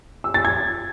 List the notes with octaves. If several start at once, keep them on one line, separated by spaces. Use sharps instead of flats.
E6
A6
G#6